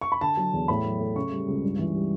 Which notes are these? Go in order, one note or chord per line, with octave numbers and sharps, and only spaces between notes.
C#6
B5
D3 A5
F#3
E2
A2 B5
F#3
A3
C#3 C#6
G3
C#2
G2
E3
G3